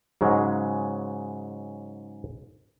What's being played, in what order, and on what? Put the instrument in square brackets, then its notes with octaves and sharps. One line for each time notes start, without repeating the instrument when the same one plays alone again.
[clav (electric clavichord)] G#2 C#3 F#3 G#3